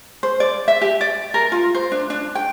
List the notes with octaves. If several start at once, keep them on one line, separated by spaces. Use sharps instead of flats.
C5
D5
E5
G4
D5
A#4
F4
C5
D4
D4
G5